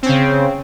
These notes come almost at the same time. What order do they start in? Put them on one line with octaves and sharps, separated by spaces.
C4 C#4 C#3